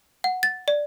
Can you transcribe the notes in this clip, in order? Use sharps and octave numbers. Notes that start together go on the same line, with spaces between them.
F#5
A6
D5